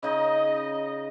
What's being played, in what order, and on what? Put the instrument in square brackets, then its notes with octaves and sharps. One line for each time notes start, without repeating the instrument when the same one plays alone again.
[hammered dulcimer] C#3 D#4 [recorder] D#5